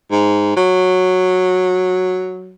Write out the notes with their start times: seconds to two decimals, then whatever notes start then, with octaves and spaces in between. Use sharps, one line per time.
0.11 G#2
0.56 F#3